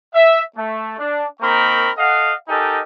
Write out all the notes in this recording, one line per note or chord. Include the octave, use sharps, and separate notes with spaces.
E5
A3
D4
A#3 C4 D#4 A#4 B5 C#6
A4 D#5 F5 F#5
D#4 G4 A4 A#4 D#5 G#5